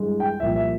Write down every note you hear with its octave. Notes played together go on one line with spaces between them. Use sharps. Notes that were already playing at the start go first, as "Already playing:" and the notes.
Already playing: G2 E3 G#3
G5
C2 A#2 F3 A#3 E5
E5